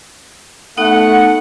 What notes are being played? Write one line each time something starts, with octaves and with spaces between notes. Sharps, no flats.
A3 B3 D#4 F#5 D#6